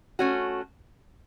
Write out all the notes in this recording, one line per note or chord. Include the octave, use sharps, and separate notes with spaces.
A3 C#4 F#4